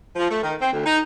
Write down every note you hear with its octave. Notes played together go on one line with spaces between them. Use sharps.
F3
A3
D#3
C4
D2
D#4